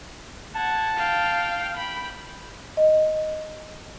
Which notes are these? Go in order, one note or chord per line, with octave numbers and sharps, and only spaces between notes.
F#5 A5 G#6
F5 G5
G5 B5
D#5